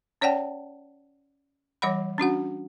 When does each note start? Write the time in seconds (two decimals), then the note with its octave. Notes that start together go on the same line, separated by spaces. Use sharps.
0.21 C#4 C#5 D5 F#5 G5 A5
1.82 E3 G3 C#5 F#5 B5
2.18 C#4 D4 F#4 F#5